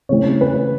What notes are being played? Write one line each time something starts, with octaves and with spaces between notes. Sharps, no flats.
C#3 E3 A3 C4 C#5
B4